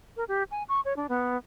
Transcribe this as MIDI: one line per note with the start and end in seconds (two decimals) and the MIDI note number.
0.17 0.24 70
0.28 0.43 67
0.51 0.63 80
0.69 0.81 85
0.85 0.96 73
0.97 1.07 62
1.09 1.37 59